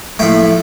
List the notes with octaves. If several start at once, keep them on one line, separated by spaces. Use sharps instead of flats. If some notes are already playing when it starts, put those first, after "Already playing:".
A2 F3 A3 G5